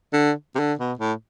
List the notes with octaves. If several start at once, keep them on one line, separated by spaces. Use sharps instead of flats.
D3
C3
D3
B2
A2